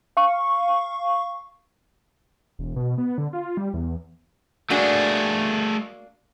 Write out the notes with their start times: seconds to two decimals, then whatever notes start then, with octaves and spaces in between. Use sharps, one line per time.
0.17 F5 C#6
2.59 E1
2.76 B2
2.98 B3
3.18 D3
3.33 F4
3.57 G3
3.74 E2
4.70 A3 A#3 D4 F#4 G#4